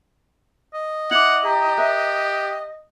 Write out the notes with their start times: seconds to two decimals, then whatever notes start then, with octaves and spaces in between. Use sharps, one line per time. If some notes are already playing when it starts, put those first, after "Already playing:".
0.74 D#5
1.11 E4 F#5 D6 F7 F#7
1.45 G4 A#5
1.78 A#4 E5 F#6